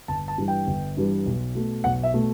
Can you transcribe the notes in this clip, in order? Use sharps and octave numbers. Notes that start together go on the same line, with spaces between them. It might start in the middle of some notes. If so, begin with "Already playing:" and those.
G1 A5
A5
G2 E3 G3
G5
G1
G2 E3 G3
B1
B2 A3
B1 F#5
E5
B2 A3